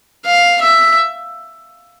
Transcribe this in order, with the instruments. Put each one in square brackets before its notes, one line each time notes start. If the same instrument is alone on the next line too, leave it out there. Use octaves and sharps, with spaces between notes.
[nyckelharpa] F5
E5